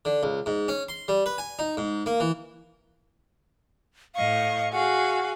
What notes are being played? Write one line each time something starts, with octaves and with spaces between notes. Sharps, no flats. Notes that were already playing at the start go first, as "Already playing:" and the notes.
D3
C#2
G#2
C#4
C6
G3
B4
G#5
D#4
G#2
A#3
E3
A2 D#5 F5 C#6
F#4 G#4 F5 F#5